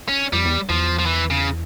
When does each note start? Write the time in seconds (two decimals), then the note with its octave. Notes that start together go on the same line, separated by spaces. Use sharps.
0.08 C#4
0.33 F2 G3
0.45 E2
0.69 E2 F3
0.99 F3
1.06 E3
1.30 C#3